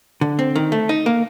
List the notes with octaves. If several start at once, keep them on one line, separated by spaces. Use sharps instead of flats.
D3
C4
D#3
A3
D#4
A#3